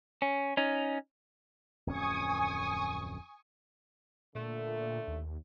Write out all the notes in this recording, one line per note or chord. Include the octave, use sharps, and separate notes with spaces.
C#4
C#4 D#4
D1 F2 C#4 G#5 C#6 D#6
A#2 D3 A3
D#2